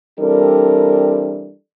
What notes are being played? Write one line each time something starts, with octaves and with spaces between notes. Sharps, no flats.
E3 G3 C4 D4 A4 A#4